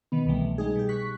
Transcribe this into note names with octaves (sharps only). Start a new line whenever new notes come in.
B2 D#3 B3
C2 B2 E3 G3 A3
G3 G#3 D#4 G#4
B2 G4
C#6 F#6 B6